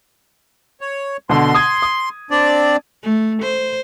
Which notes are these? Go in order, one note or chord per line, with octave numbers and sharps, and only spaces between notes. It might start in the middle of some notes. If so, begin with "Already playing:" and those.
C#5
B2 D3 C6
D#6 G#6
D#6
C4 D4 D5
A3
C5